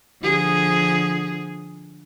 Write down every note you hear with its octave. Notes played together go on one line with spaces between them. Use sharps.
D3 F3 G#4